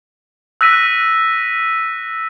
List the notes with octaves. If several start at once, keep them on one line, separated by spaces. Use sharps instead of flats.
E6 F#6 A#6 B6 D#7